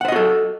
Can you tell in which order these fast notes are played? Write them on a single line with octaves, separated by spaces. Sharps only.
F#5 C5 D#5 F#4 A4